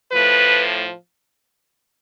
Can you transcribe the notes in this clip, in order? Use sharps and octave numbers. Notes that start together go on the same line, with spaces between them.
A2 F3 B4